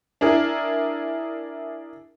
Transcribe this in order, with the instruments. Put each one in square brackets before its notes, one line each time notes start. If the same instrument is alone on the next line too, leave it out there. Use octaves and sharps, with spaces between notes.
[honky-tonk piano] D4 E4 G#4 A#4